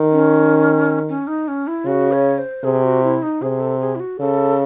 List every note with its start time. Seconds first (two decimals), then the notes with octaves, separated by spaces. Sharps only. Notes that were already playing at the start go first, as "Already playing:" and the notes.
Already playing: D#3
0.12 C#4
1.09 C#4
1.27 D#4
1.48 C#4
1.67 E4
1.86 C#3 F#4
2.12 C#5
2.38 C5
2.64 C3 G#4
2.84 F#4
3.03 E4
3.23 D#4
3.42 C3 G#4
3.61 A4
3.80 G#4
3.96 E4
4.00 F#4
4.19 C#3 A4